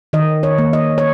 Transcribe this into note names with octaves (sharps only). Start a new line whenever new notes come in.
D#3 D#5
C#5
A#3
D#5
C#5